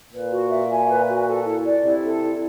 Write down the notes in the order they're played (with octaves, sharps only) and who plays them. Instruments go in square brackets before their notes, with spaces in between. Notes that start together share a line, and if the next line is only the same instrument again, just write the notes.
[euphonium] A#2 [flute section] B4
[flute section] F#4
E5
G#5
B4
F#4
A4
E4
D5
[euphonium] C3 [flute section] E4
[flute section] A4
E4